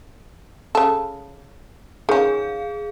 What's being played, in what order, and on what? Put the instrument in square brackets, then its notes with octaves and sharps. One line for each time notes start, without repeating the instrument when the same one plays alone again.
[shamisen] C#3 A4
[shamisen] D#3 C#4 [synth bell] G#4 F5